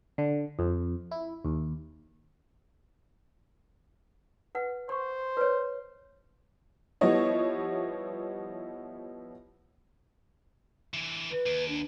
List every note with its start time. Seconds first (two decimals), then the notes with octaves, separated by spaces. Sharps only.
0.18 D3
0.59 F2
1.11 E4
1.45 D#2
4.55 B4 F#5
4.89 C5 C6 C#6
5.37 B4 C#5
7.01 F3 G3 B3 E4 C#5 D#5
10.94 D3 E3
11.32 B4
11.46 D#2
11.69 D4